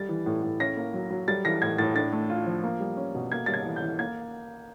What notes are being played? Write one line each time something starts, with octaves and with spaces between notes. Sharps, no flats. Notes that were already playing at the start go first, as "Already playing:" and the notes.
Already playing: G3 A6
E3
A2
A2
C#4 A#6
A#3
F#3
F#3
G3 A6
E3 A#6
A2 G#6
A2 A6
D4 A6
A3
F4
F3
A#3
G3
C#4
B2
A#3 G#6
G3 A6
G#6
E3
G6
E3
A#3 G#6